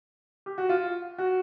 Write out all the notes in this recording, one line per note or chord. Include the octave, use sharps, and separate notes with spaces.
G4
F#4
F4
F#4